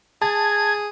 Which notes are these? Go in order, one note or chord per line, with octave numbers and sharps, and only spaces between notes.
G#4 A5 G#6